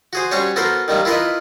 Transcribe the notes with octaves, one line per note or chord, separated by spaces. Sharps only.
F#4 G#4 C5
G3 C#4 F#4 C5 C#5
B3 F#4 A4 A#4 C5
D#3 G3 A#3
E4 F4 A#4 B4 D#5